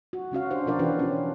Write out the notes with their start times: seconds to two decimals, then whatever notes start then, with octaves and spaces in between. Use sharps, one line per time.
0.13 F#4
0.31 C#3 C#4 F#4 F5
0.51 D4 G4 C5 F5
0.66 B2 F3 F4 A#4 D5 F5
0.79 E3 C#4 D4 F#4 G4 B4
0.99 C#4 F4